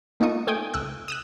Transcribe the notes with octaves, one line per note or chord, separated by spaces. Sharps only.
A3 A#3 D#4 F4 C#6 D#6
A3 G5 G#5 D#6 D7
C#2 E6 F#6
D#6 E6 F#6